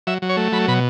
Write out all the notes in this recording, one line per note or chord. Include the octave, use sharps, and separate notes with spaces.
F#3 E5
F#3
C#5
A3
F#3 B5
B2 B5